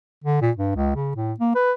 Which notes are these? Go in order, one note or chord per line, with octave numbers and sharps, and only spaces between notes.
D3
A#2
G2
C#2
C#3
A2
A#3
B4